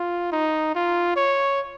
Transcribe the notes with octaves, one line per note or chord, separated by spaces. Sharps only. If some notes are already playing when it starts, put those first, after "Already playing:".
Already playing: F4
D#4
F4
C#5